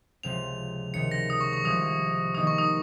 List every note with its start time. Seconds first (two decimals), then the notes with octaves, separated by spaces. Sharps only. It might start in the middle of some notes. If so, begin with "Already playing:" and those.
0.23 C#2 C3 F3 C4 F7
0.94 C#2 C3 D#3 C#7
1.11 A#6
1.30 D#6
1.41 C#6
1.53 C#6
1.64 C2 C3 F3 G#3 D#6
2.35 D#3 A#3 D#4 G#4 D#5 D#6
2.47 C#6
2.58 D#6